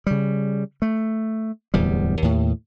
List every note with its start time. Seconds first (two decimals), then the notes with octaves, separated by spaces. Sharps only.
0.07 C#3 G3
0.82 A3
1.74 D1 E2 G3
2.22 D#2 A2